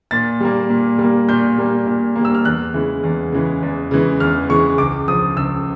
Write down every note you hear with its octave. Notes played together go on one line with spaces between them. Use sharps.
A#2 A6
G3 A#3
A#2
G3 A#3
A#2 G6
G3 A#3
A#2
A#3
G3 E6
F6
E2 F#6
C#3 E3 G#3
E2
C#3 E3 G#3
E2
C#3 E3 G#3
E2 F6
C#3 E3 G#3 C#6
C#2 D6
C#3 F3 D#6
C#2 E6